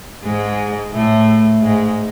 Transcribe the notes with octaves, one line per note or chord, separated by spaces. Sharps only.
G#2 G#3
A2 A3
G#2 G#3